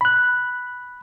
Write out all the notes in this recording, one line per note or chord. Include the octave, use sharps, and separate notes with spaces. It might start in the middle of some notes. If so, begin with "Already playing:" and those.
B5 F#6